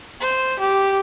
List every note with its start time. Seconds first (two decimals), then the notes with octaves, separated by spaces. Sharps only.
0.20 C5
0.59 G4